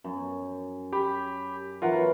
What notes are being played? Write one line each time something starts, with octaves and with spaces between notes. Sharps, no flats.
F#2
G4 B5
E3 F#3 F4 A#4 F#5